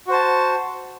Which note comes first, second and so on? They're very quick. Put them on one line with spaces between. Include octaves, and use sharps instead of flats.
F#4 C5 A5